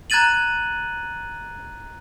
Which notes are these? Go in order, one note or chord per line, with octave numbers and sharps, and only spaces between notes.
A#5 F#6 G#6 A6 D#7 F#7